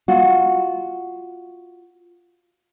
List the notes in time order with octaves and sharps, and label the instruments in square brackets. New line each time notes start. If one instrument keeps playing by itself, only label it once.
[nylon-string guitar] F4 F#4